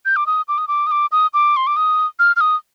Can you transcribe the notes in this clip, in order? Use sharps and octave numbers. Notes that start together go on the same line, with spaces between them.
G6
D6
D#6
D6
D#6
D6
D#6
D6
D#6
D6
C6
D6
D#6
F6
F6
D#6